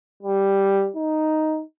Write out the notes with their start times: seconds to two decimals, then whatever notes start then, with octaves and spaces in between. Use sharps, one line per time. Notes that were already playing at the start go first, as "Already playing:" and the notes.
0.23 G3
0.96 D#4